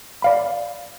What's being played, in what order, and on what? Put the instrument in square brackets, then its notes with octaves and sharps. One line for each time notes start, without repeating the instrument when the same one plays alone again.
[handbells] D5 F5 B5